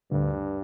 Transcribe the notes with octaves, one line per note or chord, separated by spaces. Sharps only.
D2 G2